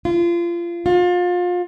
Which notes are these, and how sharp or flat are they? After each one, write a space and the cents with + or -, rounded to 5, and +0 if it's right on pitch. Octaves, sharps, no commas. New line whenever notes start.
F4 -30
F4 +30